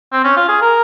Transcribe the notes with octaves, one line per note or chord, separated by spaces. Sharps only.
C4
C#4
F4
G#4
A#4